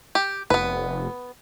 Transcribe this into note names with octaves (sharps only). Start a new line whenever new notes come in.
G4
F1 B3 B4